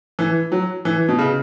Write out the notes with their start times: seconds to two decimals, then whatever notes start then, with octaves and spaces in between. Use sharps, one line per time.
0.19 E3
0.52 F#3
0.85 E3
1.08 B2
1.19 C#3